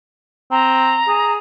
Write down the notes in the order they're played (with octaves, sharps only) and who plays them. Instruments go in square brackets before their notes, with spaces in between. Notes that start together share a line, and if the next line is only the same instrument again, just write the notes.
[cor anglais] C4 [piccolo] A#5
[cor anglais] G#4